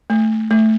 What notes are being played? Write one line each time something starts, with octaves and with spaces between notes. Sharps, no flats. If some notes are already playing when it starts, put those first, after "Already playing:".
A3
A3